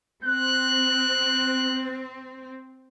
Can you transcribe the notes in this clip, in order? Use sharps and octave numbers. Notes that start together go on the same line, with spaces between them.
C4 F#6